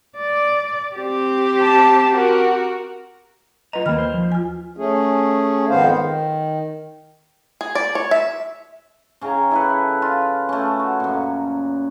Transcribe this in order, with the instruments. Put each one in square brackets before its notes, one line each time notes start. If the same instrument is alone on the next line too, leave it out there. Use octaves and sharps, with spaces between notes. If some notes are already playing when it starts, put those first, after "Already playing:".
[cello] D5
C4 G4
[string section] A5
F#4 A#4
[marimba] F#3 B4 D#5 [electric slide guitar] F4 A#5
[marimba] D#2 B5 F6 [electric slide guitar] D#3 A#3
[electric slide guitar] C5
F3
[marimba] F4 G#5
[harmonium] A3 C#4 G#4
F2 G#2 D#3 B3 C5 F5
D#3
[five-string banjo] G#4
D5
C#5
E5
[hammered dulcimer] C#3 C#4 G5 A#5
E4 A4 B4
F4
A3 C#4
F#4
F#2 A#2